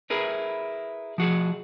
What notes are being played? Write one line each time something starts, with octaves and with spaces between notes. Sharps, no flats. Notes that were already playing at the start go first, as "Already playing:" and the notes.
E4 G#4 A#4 B4
F3 F#4 G#4